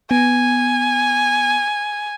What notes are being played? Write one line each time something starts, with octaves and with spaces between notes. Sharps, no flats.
B3 G#5